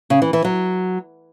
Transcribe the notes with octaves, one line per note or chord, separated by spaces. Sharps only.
C#3
E3
E3
F#3